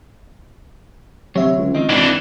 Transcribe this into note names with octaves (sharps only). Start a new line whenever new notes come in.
D2 C3 F#3 C#5 E5
C#2
D#3 C4 D#4 D#5
G#1 E3 D4 D5